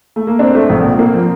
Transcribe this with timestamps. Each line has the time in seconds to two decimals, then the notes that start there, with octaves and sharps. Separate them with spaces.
0.16 A3
0.27 A#3
0.39 C4 D4
0.55 A3
0.70 A#1
0.84 A#2
0.99 A#3
1.14 F3